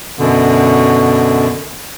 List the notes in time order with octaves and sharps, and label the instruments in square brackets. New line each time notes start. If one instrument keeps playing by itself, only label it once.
[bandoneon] F#2 B2 D3